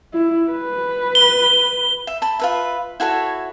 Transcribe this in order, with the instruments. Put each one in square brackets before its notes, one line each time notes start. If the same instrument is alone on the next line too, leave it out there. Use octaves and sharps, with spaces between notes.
[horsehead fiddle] E4
B4
[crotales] G7
[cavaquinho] E5
A5 B5
F4 B4 E5
E4 F#4 A4 C#5